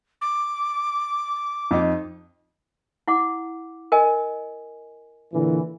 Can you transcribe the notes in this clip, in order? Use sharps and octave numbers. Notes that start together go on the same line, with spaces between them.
D6
F2 D#4
E4 F#5 D6
A#4 D#5 G#5
A#2 D3 E3